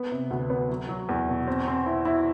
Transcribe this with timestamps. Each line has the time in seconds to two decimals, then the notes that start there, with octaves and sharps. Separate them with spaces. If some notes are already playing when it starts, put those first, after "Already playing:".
Already playing: B3
0.11 C3
0.31 D2
0.50 B3
0.70 F#3
0.89 F#3
1.09 E2
1.29 B2
1.48 C4
1.68 C4
1.86 E4
2.05 E4